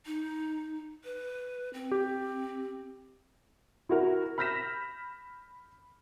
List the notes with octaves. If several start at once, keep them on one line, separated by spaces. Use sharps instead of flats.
D#4
B4
C4
G4
E4 F#4 A#4
B5 F6 G6 A#6 B6 E7